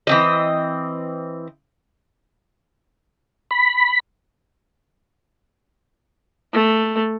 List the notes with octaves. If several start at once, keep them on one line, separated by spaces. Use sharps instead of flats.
E3 C4 D#5
B5
A3